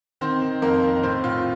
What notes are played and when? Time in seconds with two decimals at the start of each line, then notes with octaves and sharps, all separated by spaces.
0.21 D#3 C4 C5
0.42 D#3
0.62 F2 A#3 A#4
0.83 D#3
1.03 A2 C4 C5
1.24 A2 F4